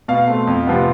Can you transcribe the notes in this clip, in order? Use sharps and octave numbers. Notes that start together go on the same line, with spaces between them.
B2 F5
A3 C4
F2
C3 F3 B3